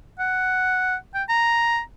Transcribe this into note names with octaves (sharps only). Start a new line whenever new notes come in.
F#5
G5
A#5